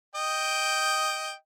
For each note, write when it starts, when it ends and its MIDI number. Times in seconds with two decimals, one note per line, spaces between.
0.15 1.33 75
0.15 1.33 79